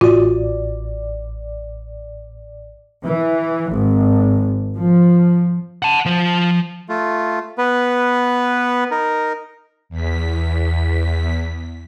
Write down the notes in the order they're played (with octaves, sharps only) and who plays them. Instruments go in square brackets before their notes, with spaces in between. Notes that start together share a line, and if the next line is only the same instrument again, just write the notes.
[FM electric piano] A1 D5 [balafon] F4 F#4
[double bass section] E3
G#1
F3
[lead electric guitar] F#5 A5
F3 C5
[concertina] A3 F4
B3 B4
D#4 A#4
[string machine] E2 B6